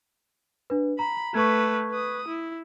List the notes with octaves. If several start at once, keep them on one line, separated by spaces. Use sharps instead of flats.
D4 B4
A#5 B5
A3 B4 C#6 G#6
B4 D#6
E4